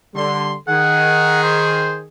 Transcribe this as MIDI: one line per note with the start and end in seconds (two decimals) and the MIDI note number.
0.14 0.55 50
0.14 0.55 55
0.14 0.55 84
0.68 2.06 51
0.68 2.06 68
0.68 1.40 78
1.43 1.96 72